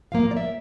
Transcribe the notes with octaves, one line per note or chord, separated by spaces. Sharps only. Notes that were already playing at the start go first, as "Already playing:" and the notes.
A2 F3 A#3 F5
D5
E5